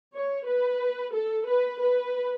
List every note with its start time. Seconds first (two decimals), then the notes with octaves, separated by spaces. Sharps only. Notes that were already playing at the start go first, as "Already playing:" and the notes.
0.14 C#5
0.47 B4
1.14 A4
1.47 B4
1.80 B4